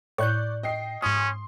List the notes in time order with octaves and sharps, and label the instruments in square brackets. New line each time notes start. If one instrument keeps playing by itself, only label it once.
[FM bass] A2 [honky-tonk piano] D5 [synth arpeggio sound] C#6 F#6 G6
[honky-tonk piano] D#5 G5 C7
[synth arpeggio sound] G#2 D#6 [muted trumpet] C#4 [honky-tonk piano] C6